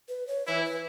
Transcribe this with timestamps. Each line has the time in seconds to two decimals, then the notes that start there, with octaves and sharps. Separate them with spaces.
0.08 B4
0.27 C#5
0.47 E3 E4 B4
0.65 B4